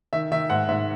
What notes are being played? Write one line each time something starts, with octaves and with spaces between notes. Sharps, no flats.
D#3 E5
D#3 E5
G#2 F#5
G#2 E5